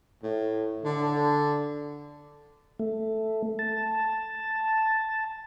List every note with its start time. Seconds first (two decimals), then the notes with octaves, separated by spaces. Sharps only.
0.23 A2
0.83 D3
2.79 A3
3.59 A5